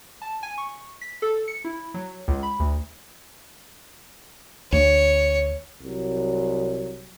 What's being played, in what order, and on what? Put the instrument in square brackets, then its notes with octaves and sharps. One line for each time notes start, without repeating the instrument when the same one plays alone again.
[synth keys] A5
G#5
C#6
B6
A4
C#7
E4
F#3
C#2
B5
D2
[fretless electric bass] D2 [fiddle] C#5
[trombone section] C2 F#3